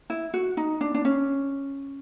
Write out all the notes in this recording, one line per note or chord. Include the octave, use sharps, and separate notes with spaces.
E4
F#4
D#4
D4
D4
C#4